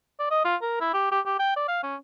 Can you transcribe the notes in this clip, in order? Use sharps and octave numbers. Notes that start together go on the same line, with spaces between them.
D5
D#5
F4
A#4
E4
G4
G4
G4
G5
D5
F5
C#4